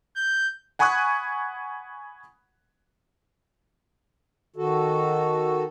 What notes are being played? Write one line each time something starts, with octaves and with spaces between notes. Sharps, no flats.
G6
F#5 G#5 B5 C#6 D#6 F#6
D#3 F#4 A4